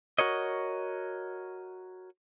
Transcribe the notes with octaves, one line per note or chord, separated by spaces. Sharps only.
F#4 A#4 C#5 D#5